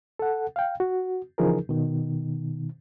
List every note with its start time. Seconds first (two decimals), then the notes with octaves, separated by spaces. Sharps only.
0.19 A4 F#5
0.56 F5 G5
0.80 F#4
1.38 C#3 E3 F3 D#4 G#4 A#4
1.69 B2 D#3